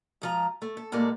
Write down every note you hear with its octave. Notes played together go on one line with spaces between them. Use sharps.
G#2 F3 A#5
A3
A4
D#2 A2 G#3 A#3 D5